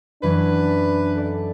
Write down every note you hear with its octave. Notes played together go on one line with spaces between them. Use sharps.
F#2 E3 F#3 D4 B4
A4 D5